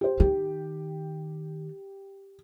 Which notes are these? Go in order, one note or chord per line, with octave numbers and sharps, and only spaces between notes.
G4 C5
D#3 G4